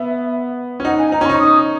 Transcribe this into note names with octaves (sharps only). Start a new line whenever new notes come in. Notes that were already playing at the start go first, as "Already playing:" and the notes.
Already playing: B3 E5
C#4
D#4 F#5
G#5
D#4 A#5
C#4
D#4 C#6
D#6